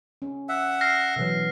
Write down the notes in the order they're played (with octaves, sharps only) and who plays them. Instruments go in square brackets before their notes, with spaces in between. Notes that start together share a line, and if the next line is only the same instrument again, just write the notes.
[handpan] C#4
[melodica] E5 F#5
[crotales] F6 A#6 C7
[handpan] B2 E3 F#3